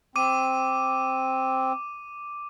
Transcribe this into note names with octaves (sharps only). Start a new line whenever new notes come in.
C4 D6 D#7